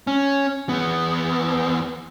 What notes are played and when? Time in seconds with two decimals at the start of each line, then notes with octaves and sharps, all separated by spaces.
0.07 C#4
0.69 E2 B3